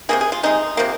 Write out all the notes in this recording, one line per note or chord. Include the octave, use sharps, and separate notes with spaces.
C3 D#3 A#3 G#4
G#4
F4
C3 G#3 D#4
C3 F3 A#3